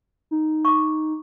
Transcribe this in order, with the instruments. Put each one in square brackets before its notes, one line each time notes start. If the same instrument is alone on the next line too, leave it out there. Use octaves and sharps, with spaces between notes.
[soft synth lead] D#4
[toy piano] C#6 D6